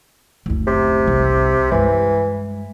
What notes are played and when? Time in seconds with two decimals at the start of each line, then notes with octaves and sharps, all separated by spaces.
0.46 F#1 D2
0.67 C3
1.07 C2
1.72 G2 E3 G#3